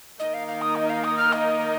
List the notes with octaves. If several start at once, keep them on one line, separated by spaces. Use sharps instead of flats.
D#3 A#3 D#4 A#4 D#5
F5
F5
D#6
D#5
F5
D#6
F6
D#5